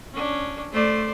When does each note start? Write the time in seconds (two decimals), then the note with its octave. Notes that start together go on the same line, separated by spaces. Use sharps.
0.13 C#4 D4
0.73 A3 C5 D5